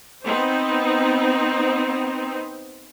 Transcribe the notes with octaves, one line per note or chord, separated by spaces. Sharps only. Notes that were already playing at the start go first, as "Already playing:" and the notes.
B3 C4 D#4 C5